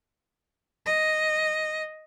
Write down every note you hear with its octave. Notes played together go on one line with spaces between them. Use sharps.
D#5